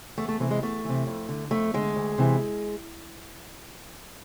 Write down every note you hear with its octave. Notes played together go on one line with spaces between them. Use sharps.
E2 A3
A3
C3 E3 A3
G#3
E2 A3
C3 E3
F2
D3
F2 A3
D3 G#3
D2
C3 E3